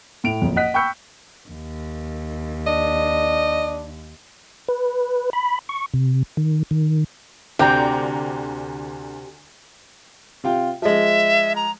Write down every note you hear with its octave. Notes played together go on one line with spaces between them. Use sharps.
A2 D7 F7
F#1 F2
D#5 F#5 F#6 B6
G5 B5 C#6 E6 G6 C#7
D#2
D4 D#5
B4
B5
C#6
C3
D#3
D#3
D2 C3 D5 G5 A#5
C3 F4 G5
F3 G#3 E5
A#5